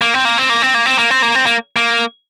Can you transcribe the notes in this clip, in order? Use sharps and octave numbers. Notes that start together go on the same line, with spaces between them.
A#3
C4
A#3
C4
A#3
C4
A#3
C4
A#3
C4
A#3
C4
A#3
A#3